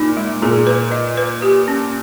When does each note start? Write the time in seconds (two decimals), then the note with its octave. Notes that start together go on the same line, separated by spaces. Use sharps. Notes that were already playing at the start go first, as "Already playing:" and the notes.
Already playing: A#2 D#4
0.17 G#3
0.42 A#2 G#4
0.67 B4
0.92 D#5
1.17 B4
1.42 G4
1.68 C#4